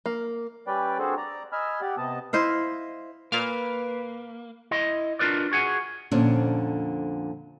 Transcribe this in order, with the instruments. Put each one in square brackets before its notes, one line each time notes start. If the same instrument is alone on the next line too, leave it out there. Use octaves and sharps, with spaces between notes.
[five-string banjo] A#3
[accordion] G3 C#4 B4 D5 G5
C4 D4 F#4 G#4 A4 C5
D5 A#5
D#5 G#5 B5 E6 F6
G4 D5 F#5
C3 B3 D#5 A5
[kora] E4 C5 D#5 F5
[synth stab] A#2 F5 F6 [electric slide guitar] A#3 [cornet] B4
[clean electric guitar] E4 D#5 C6
D4 F4 F#4 A#4 B4 D5
F#4 G#4 F#5 G#5
[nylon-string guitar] F2 A#2 D3 C4 C#4